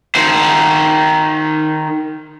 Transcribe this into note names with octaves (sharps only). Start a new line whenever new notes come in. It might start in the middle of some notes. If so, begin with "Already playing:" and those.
D#3 C5